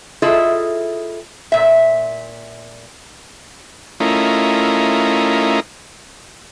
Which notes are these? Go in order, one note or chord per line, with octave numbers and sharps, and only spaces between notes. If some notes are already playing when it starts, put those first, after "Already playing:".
E4 F4 G#4 A4 D#5 E5
A#2 E5
A3 C#4 E4 F4 A#4 D#5